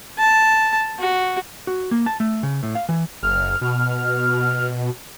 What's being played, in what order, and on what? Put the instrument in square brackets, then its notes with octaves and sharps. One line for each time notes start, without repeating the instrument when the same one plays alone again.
[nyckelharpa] A5
F#4
[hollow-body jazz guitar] F#4
A#3
A5
A3
C#3
A2
F5
E3
[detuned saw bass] F#1 [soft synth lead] F6
[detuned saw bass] B2